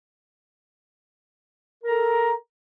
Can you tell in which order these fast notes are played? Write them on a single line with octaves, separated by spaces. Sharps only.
A#4 A#5 A4